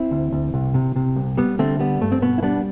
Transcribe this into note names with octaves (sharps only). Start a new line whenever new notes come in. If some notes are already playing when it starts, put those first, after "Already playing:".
Already playing: C4 E4
D2
D2
C2
C3
C3
C2
G3 B3
D3 A3 C4
G3 B3
G2 A3
C4
B2 B3
E4
G3 B3 D4